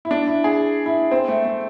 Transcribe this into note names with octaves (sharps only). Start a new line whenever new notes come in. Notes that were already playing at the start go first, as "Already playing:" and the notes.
E4
D4
E4
G#4
E4
C4
A3
A3